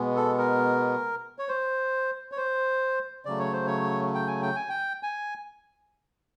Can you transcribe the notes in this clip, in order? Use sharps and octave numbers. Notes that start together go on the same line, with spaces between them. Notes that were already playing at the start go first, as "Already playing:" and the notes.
Already playing: B2 G#3 B3
A4
A#4
C#5
C5
C#5
C5
C#3 F#3 A3 D5
C#5
C5
C#5
G5
G#5
G5
G#5
G5
G#5